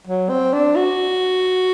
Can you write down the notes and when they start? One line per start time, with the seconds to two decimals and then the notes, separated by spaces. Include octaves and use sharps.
0.07 F#3
0.29 C4
0.53 D4
0.76 F#4